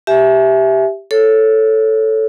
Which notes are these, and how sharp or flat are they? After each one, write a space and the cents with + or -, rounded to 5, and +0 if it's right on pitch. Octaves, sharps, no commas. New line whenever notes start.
G4 +0 E5 +0 G#5 +25
A4 +0 C#5 +0